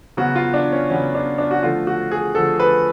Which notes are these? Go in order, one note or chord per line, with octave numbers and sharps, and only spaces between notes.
C#3 F#3 B3 F#4
F4
D4
C#4
C#3 F#3 B3 C#4
D4
D4
F#4
D3 F3 A3 F4
F#4
G#4
D3 F3 A3 A4
B4